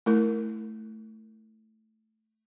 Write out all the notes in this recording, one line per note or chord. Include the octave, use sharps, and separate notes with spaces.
A3 E4 A#4